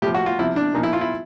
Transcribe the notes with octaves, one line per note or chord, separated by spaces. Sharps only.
A2 F3 G4
F#4
F4
C3 F3 E4
D4
A#2 F3 D#4
E4
F4
E4